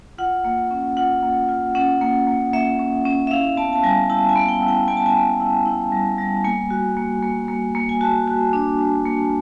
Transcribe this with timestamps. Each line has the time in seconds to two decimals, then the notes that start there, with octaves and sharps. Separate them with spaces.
0.18 F4 F#5
0.45 A#3
0.71 C#4
0.97 F4 F#5
1.23 A#3
1.49 F4
1.75 C#4 F#5
2.01 A#3
2.27 A#3
2.53 A#3 E5
2.79 C#4
3.05 C#4
3.27 E5
3.31 E4 F5
3.57 B3 A5
3.73 A5
3.84 G3 G#5
4.10 E4 A5
4.29 G#5
4.36 B3
4.49 G5
4.62 E4
4.68 G5
4.88 B3 G#5
4.97 A5
5.06 G#5
5.14 B3
5.40 E4
5.66 E4
5.92 G3
6.18 G3
6.44 A#3 G#5
6.70 F#4
6.97 A#3
7.23 A#3
7.48 A#3
7.75 A#3
7.89 G#5
8.01 F#4 A5
8.28 F#4
8.53 D4
8.79 D4
9.05 A#3